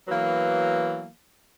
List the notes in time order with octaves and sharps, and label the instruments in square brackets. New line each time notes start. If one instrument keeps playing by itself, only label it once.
[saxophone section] E3 F#3 A#3 B3